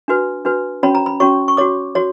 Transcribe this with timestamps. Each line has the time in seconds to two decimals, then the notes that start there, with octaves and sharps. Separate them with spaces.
0.08 D4 F#4 B4
0.45 D4 F#4 B4
0.83 C#4 F#4 C#5 B5
0.95 A#5
1.06 B5
1.20 C#4 F#4 C#5 C#6
1.48 C#6
1.57 F#4 C#5 D6
1.95 F#4 C#5